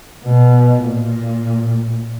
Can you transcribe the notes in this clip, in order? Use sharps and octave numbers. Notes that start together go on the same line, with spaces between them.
B2
A#2